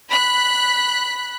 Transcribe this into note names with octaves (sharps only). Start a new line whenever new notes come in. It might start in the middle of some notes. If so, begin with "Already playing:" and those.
B5 F#6 B6